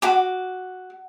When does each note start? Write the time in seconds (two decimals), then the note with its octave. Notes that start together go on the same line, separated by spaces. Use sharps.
0.02 F#4 D6